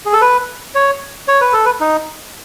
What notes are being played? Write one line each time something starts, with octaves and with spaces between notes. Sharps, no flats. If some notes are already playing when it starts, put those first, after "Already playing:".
G#4
A4
B4
C#5
C#5
B4
A4
B4
D#4